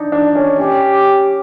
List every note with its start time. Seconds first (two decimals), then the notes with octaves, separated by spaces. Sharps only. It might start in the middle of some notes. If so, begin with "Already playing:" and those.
Already playing: D4 D#4
0.12 D4
0.35 C#4
0.59 C#4 G4